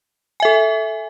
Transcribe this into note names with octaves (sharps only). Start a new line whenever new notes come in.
A4 E5 G#5